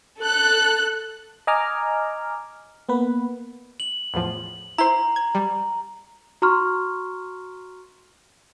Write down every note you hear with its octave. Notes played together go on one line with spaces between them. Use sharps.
A4 F#6
D#5 G#5 A#5 D6 F6
A#3 B3 B4
F#7
E2 A2 F3
E4 C5 A#5
G#6
G3
F#4 A#5 C6 C#6 F6